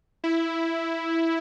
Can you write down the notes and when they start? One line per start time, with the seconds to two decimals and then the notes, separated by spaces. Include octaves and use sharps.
0.24 E4